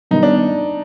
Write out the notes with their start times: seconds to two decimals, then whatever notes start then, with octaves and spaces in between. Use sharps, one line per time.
0.11 G2 D#3 B3 D#4
0.23 D4